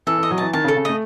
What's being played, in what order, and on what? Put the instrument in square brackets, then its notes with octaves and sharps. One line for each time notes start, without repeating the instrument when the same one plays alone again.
[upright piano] E3 [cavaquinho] A4
[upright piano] E3 [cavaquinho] D#5
[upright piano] F#3
[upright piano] E3 [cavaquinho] A5
[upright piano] D#3 [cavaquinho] A5
[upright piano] C#3
[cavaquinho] A4
[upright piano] C#3
[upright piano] A3 [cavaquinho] D#5